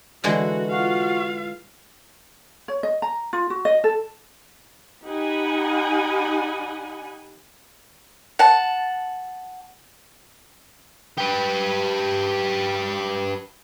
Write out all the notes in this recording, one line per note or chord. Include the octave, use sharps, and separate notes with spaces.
D3 E3 G#3 F#4
F4 F#4 F5
C#5
D#5
A#5
F4
F#4
D#5
A4
D#4 G4 F#5 G#5 B5
F#5 A5
G4 B4